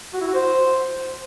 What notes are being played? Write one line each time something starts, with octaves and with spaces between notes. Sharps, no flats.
F#4
E4
F#4
C5